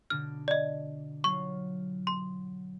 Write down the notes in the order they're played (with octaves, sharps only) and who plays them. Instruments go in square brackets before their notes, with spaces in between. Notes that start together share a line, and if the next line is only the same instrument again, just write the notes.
[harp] B2 D3 D4 [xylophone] F6
[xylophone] D5 D#5
[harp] F#3 F4 [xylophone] C#6
[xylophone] C6